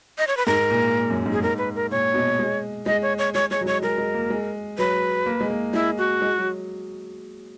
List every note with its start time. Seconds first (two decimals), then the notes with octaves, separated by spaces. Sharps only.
0.18 D#5
0.27 C#5
0.37 B4
0.46 G#2 A#4
0.71 A#2
1.10 F#2
1.26 G#2
1.33 G#4
1.42 G#2 A#4
1.58 B4
1.75 A#4
1.91 A#2 C#5
2.14 B2
2.39 G#3
2.86 G#3 D#5
3.02 C#5
3.18 C#5
3.34 G#3 C#5
3.51 G#3 C#5
3.61 F#3
3.66 G#3 C#5
3.83 G#3 A#4
3.98 G#3
4.14 A#3
4.30 G#3
4.78 F#3 B4
5.26 A#3
5.41 G#3
5.50 A#3
5.74 G#3 E4
5.98 F#4
6.22 G#3
6.38 F#3